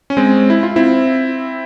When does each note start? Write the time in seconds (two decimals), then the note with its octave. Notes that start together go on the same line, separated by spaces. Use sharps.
0.10 C#4
0.17 G#3 C4
0.50 E4
0.63 F4
0.76 C4 E4